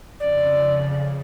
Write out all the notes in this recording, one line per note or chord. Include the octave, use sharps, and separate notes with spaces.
F2 C#3 D5